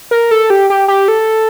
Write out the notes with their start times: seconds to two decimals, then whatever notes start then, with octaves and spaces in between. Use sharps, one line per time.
0.11 A#4
0.31 A4
0.50 G4
0.70 G4
0.88 G4
1.08 A4